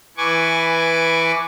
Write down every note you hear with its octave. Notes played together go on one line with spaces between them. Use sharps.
E3 B4 G#5 C#6 D6